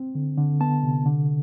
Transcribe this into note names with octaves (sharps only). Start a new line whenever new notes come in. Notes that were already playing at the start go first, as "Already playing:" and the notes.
Already playing: C4
D3
D3
B3 A5
C3
D3